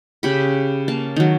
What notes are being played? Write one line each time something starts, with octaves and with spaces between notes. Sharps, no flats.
C#3 G4 B5
A#3 A5
D#3 F#3